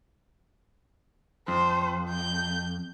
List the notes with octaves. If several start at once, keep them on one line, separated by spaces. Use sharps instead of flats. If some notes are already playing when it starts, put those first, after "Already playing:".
F2 C5
G6